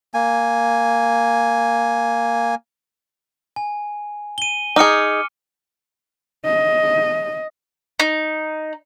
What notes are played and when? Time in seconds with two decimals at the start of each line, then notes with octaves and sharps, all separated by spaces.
0.14 A#3 G#5
3.56 G#5
4.38 D#7 G7
4.76 D#4 G#4 D6 F6 C#7
6.46 D#5
8.00 D#4